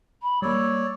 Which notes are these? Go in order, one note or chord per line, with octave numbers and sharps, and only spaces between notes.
B5
G3 A#3 C#5 D5 E6